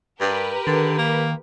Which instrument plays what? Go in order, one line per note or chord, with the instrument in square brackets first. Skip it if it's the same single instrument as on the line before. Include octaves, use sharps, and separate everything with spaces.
[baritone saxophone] G2 [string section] G4 A#4 B4
[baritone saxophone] D3 [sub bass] D#3
[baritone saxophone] A#3